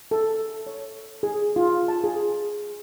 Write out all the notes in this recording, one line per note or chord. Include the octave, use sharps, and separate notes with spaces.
A4
C#5
G#4
F4
A5
G#4